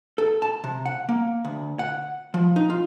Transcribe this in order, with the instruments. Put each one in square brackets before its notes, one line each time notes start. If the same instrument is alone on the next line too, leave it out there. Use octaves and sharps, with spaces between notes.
[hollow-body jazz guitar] A4
A5
C3
F#5
A#3
D2
F#5
F3
D#4
F4